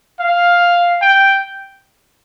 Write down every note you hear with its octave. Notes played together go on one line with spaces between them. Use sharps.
F5
G5